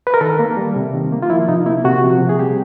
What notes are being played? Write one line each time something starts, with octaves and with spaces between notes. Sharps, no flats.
B4
A#4
D#3 A4
A#3
G3
C3
D#3
A#3
F4
F3 E4
C3 D#4
A#3 E4
C3 F#4
F3
C3
G#4
G3 G4